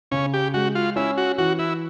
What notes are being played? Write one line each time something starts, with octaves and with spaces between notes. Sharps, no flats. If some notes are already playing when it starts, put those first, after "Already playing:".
C#3 C#4
G4
G#3 F#4
F4
C#4 E4
F#4
E3 F#4
E4